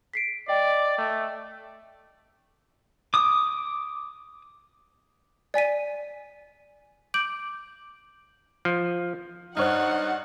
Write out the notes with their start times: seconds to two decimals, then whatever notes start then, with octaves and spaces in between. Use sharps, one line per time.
0.14 B6 C7 D7
0.48 D5 D#5 G5
0.98 A3
3.14 D6 D#6
5.54 D5 G#5 B6 D#7
7.14 D6 G6 D7 F#7
8.65 F3
9.57 G2 D#4 C5 C#5 F#5 F6 F#6